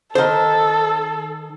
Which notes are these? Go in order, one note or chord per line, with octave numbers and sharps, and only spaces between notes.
D#3 A4 C5